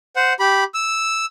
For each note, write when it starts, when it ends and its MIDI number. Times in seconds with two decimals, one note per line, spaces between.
0.16 0.33 72
0.16 0.33 78
0.40 0.64 67
0.40 0.64 83
0.74 1.26 88